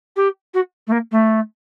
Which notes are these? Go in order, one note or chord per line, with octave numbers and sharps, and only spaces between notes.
G4
F#4
A3
A#3
A3